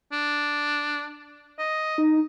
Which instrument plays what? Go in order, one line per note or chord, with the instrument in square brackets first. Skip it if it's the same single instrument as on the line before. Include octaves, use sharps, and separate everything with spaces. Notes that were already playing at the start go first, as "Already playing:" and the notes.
[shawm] D4
D#5
[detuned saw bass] D#4